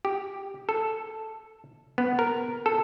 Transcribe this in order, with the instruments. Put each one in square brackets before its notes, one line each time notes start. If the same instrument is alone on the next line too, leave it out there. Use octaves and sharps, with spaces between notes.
[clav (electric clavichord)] G4
A4
B3
A#4
A4